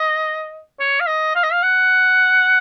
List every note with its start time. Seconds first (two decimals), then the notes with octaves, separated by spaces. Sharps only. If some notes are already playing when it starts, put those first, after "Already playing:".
Already playing: D#5
0.80 C#5
1.00 F5
1.07 D#5
1.35 F5
1.43 D#5
1.52 F5
1.63 F#5